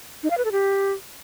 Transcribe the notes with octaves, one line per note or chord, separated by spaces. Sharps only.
D#4
F5
B4
A4
G4